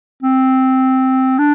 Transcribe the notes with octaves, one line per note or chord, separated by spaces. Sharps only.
C4
D4